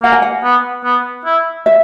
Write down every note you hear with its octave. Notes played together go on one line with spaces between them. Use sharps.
A#3 F#5
G#5
F#5
B3
B3
E4
E5